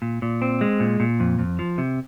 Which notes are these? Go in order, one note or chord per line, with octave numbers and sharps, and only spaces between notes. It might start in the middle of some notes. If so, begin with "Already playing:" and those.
A#2
A#2
C4
G#3
A#2
A#2
F2
F2
F3
C3